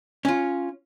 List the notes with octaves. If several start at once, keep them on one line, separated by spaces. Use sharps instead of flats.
C#4 F4